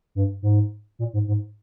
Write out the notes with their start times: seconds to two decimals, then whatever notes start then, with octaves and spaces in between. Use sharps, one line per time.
0.15 G2
0.42 G#2
0.99 A#2
1.13 G#2
1.28 G#2